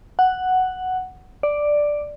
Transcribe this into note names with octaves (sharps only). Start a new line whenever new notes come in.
F#5
D5